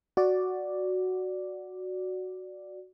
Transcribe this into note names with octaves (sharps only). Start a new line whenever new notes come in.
F#4 D5